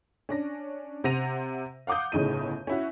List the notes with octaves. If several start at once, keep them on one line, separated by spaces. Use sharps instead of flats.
C#4 D4 A#6
C3 C5 F#5 A#6 D#7 F7
F5 F#5 D6 D#6 G6
G1 A2 C#3 D#4 D#7
C#4 E4 F#4